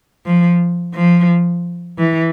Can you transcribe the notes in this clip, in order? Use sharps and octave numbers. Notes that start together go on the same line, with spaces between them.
F3
F3
E3